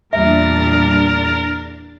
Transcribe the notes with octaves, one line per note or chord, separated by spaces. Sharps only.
E2 A#2 G3 D4 A#4 E5 A6